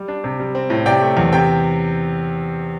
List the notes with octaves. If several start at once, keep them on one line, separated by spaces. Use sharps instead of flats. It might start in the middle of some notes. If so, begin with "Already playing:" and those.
Already playing: G3
D4
C3
G3
C4
A2
C3 D5 G5
A3
E2
C3 G5